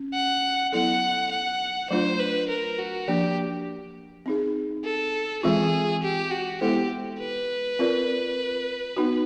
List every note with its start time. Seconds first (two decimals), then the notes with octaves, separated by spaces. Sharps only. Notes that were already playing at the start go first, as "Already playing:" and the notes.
Already playing: C#4
0.14 F#5
0.72 F#3 B3 E4 A4 F#5
1.31 F#5
1.90 F#3 A3 D4 F4 C5
2.20 B4
2.49 A#4
2.79 F#4
3.08 F3 A#3 D4 G4
4.26 C4 D#4 G#4
4.85 A4
5.43 E3 G#3 C4 F4 G#4
6.02 G4
6.31 F#4
6.61 G#3 B3 E4 G4 A4 C5
7.20 B4
7.79 C4 F4 A#4 D5
8.96 B3 D#4 F#4